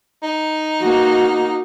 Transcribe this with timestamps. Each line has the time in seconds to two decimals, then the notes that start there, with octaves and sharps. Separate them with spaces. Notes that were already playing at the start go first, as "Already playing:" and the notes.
0.23 D#4
0.80 A#3 F#4